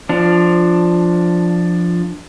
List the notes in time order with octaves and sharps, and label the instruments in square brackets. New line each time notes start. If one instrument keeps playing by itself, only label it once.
[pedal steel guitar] F3 D4